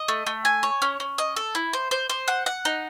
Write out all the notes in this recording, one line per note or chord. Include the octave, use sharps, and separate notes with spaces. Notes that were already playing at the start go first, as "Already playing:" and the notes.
Already playing: D#5
A3
A3
G#5
C#5
C#4
C#4
D#5
A4
E4
C5
C5
C5
F#5
F#5
D#4